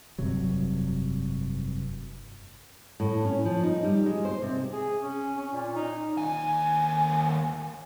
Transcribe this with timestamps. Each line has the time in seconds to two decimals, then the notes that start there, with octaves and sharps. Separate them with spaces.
0.18 F1 G2 C3 F#3
3.00 A2
3.25 C#4
3.45 F3
3.63 D#4
3.84 G3
4.06 G#3
4.25 C5
4.42 C3
4.72 G#4
5.01 C#4
5.38 C#4
5.53 A#2
5.75 D#4
6.18 D#2 G#5